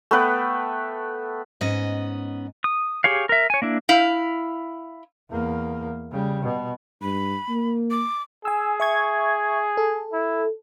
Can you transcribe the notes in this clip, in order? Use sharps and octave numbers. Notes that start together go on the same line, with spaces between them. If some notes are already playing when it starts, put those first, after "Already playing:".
A3 B3 B4 G5
G#2 B3 C#4 D#5
D#6
G4 G#4 C#5 F5
A#4 E5
C#5 G#5
A#3 D4 E4
E4 F5
E2 A#3
C#3 G3
B2
G2 B5
A#3
D6
G#4 G#5 E6
E5 C#6 G#6
A4
E4